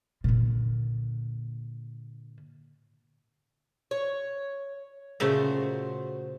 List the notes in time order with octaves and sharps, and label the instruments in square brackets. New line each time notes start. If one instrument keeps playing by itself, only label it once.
[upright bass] A#2 D3
[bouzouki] C#5
[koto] A#2 C#3 A3 [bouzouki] F#4 C5